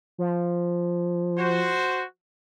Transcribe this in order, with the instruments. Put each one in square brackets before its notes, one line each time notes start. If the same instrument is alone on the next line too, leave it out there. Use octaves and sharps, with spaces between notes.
[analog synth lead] F3
[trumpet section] F#4 C5